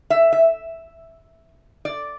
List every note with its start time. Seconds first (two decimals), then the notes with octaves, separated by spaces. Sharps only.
0.10 E5
0.33 E5
1.85 D5